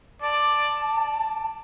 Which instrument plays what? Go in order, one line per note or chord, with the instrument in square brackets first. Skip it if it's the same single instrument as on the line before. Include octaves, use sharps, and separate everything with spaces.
[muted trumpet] D5 [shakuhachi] A5